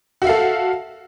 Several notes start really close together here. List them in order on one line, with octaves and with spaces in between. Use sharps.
F#4 E5 F5 A4